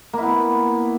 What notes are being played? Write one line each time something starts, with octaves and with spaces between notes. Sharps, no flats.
A#3 B3 E4